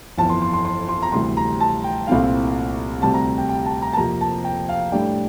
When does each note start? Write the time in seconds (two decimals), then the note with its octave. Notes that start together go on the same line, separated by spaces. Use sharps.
0.18 G1 F2 E3 A5
0.29 C6
0.42 C6
0.53 C6
0.65 C6
0.89 C6
1.02 A#5
1.12 D2 C3 E3 G3 C6
1.37 A#5
1.60 A5
1.84 G5
2.07 C2 A#2 A3 C4 E4 F5
3.02 D2 C3 G3 C4 A5
3.14 A#5
3.38 G5
3.49 G5
3.66 A5
3.82 A#5
3.93 A5
3.97 F2 C3 F3 A#3 A#5
4.21 A5
4.44 G5
4.69 F5
4.92 A2 G3 D4 G5